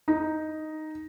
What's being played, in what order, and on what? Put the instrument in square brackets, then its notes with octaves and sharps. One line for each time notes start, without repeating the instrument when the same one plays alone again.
[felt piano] D#4